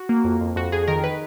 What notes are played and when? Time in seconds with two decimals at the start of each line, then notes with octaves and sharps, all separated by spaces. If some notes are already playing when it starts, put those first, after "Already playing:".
Already playing: F#4
0.09 A#3
0.24 F2
0.41 F2
0.56 F2 F#4
0.72 F2 G#4
0.88 D#3 A#4
1.04 B4